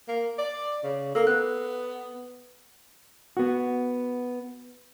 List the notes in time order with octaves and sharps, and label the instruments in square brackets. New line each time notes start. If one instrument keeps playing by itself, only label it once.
[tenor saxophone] A#3
D5
C#3
[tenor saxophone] A#3 [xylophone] A4
[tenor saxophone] B3 [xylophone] F#6
[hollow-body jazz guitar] B3 F#4